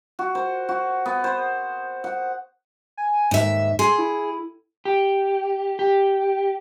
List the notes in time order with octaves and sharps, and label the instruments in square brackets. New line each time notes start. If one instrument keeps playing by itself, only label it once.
[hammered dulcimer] F#4
C5
F#4
B3
C5
F#5
[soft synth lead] G#5
[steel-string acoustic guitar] D#2 E5 [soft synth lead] G#2
[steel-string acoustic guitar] G#4 [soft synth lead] C6
[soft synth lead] E4
[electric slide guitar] G4
G4